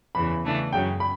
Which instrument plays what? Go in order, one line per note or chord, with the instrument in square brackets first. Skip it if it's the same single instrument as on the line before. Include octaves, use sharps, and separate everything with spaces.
[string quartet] E2 C#3 E3 [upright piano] B5
[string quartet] C#3 E3 A3 D4
[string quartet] F#2 C#3 F#3 C#4 [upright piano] G5
[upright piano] B5